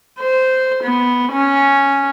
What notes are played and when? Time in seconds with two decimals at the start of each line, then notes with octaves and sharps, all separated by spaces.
0.20 C5
0.84 B3
1.32 C#4